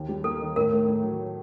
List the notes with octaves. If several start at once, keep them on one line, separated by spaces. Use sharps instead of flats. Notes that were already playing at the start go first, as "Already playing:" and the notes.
Already playing: D#2
G3
A#3 A4
D#3
A2 A#4
A3
A2
F#3